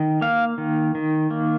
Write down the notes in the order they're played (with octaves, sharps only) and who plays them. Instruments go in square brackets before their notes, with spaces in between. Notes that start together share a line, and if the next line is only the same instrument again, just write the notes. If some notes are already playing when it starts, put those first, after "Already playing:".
Already playing: [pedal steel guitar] D#3
A#3 F5
D#3
D#3
A#3